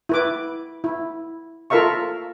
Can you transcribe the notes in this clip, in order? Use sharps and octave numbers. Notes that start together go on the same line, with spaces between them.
E4 B4 D6
E4
F4 A4 A#4 E5 F5 C#6